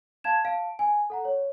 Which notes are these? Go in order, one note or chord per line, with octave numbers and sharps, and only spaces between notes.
F5 A5 G#6 E7
F5 A5 D7
G#5
A4 F#5 A#5
C#5